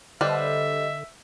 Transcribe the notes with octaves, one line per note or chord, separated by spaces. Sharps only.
D3 G3 B4 C5 D#5 E5